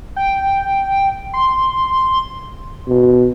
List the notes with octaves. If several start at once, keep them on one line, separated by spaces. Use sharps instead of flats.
G5
C6
B2